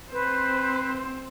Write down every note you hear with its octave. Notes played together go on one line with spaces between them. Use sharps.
C4 B4 C5